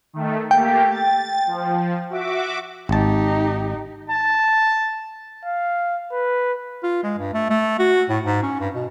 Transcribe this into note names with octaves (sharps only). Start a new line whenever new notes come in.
D#3 A3
A3 A#3 G4 G5
A6
F3
F#4 E5 D6
G#1 D#4 G4 A5
A5
F5
B4
F4
G#3
G2
A3
A3
F#4
A2
G#2
C#4
G2
B2